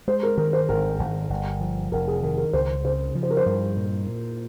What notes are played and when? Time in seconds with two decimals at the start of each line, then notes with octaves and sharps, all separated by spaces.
0.07 G#3 C5
0.23 A#4
0.37 D#3 A#4
0.53 C5
0.69 G#1 A#4
0.99 G#1
1.30 G1
1.61 F3
1.92 F1 A#4
2.07 G#4
2.23 D#3 A#4
2.38 A#4
2.53 C#2 C5
2.85 C#3 C5
3.15 F3
3.23 C5
3.31 A#4
3.37 C5
3.46 G2
3.77 A#2
4.07 A#2